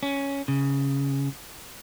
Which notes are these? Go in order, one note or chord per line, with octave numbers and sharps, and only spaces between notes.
C#4
C#3